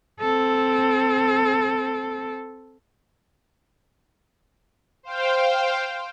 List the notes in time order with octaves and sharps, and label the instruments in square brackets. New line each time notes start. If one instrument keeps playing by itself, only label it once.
[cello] C4 A4
[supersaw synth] C5 F5 G5